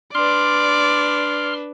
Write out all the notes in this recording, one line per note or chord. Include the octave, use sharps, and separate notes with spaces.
D4 B4 D5 C6 F6